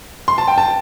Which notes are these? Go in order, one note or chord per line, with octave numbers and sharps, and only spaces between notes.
C6
A5
G5
A5